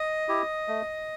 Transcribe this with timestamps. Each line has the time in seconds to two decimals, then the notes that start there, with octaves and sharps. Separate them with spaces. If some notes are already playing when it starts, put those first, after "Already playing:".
Already playing: D#5 D#6
0.28 E4 G4
0.68 A3